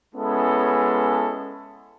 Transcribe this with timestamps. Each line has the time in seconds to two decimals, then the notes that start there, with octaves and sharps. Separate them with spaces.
0.15 G#3 B3 C#4 E4 A4